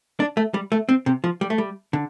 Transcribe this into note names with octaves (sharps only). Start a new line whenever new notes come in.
D4
A3
G3
A3
C4
C3
F3
G3
A3
G3
D3